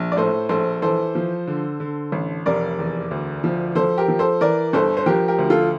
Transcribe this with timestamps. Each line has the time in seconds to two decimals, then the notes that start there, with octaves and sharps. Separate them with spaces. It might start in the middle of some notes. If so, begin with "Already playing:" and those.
Already playing: A#1
0.12 D5
0.17 A2 A4 C5
0.49 A#1 A4 C5
0.82 E3 A4 C5
1.15 F3
1.47 D3
1.80 D3
2.12 A1
2.46 F1 A#4 D5
2.79 E2
3.11 D2
3.44 F3
3.75 F3 A4 C5
3.98 G4 A#4
4.08 F3
4.19 A4 C5
4.41 E3 A#4 D5
4.73 G1 A4 C5
4.97 C5
5.06 F3 G4 A#4
5.28 G4 A#4
5.38 D2
5.50 F4 A4